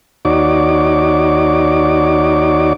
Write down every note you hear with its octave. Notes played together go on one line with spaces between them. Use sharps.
D#2 D#4 F#4 C#5 D5 D6